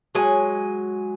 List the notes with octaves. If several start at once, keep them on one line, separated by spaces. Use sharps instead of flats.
F#3 G#3 G#5